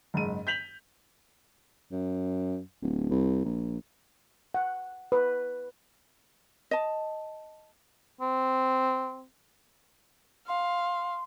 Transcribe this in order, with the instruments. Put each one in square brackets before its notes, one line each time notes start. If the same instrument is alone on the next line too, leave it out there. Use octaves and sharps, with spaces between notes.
[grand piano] F#1 G#2 D#7
G6 B6 F7 F#7
[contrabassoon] F#2
D1
C2
A#1
[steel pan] F#5
B4
[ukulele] D#5 A5
[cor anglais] C4
[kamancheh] F5 [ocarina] C6